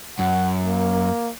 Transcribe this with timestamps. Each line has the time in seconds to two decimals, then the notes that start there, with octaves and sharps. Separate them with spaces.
0.19 F#2 F#5
0.65 A#3